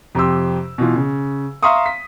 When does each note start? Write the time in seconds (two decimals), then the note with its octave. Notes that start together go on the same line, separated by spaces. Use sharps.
0.15 F2 C3 G4 C6 E6
0.78 B2 E3 F4
0.96 C#3
1.63 E5 F5 A#5 C6 C#6 D#6
1.86 B6